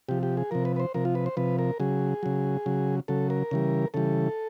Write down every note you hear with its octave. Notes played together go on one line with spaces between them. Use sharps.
C3 F3 G4
G4
G#4
C3 F3 A#4
B4
B4
C5
C3 F3 A#4
F4
B4
C5
C3 F3 B4
A#4
C#3 F#3 G#4
C#3 F#3
C#3 F#3
C#3 F#3 A4
A#4
C#3 E3 G3
C#3 E3 G3 A4